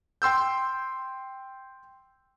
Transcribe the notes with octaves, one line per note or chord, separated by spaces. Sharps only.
G5 C6 E6 G6